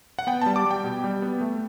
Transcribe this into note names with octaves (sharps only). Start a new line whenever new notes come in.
F#5
B3 G5
G3 A5
D6
G3
G5
B2
G3
B3
A3